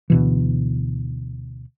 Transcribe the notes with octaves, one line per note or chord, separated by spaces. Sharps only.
D2 B2 E3